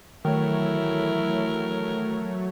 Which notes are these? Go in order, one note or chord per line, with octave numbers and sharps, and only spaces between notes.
D#3 E3 F#3 A3 E4 A#4 C#5